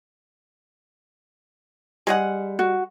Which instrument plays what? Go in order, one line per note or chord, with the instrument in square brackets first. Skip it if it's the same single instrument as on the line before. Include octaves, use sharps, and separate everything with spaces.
[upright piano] G3 [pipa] G#3 G#4 F#5
[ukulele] F#4